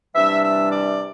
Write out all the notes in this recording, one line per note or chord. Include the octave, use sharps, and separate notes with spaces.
C3 E3 G3 D4 E5
E5
D5